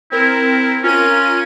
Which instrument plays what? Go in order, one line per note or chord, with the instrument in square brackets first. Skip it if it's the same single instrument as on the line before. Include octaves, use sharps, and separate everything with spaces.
[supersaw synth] C4 A#4 [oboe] E4
[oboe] C#4 [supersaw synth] F4 A#4 D#7